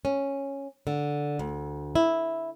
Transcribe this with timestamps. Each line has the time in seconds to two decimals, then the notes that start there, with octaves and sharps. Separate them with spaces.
0.05 C#4
0.87 D3
1.39 D2
1.95 E4